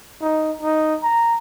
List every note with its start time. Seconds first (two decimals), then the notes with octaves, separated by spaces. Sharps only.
0.22 D#4
0.61 D#4
1.03 A#5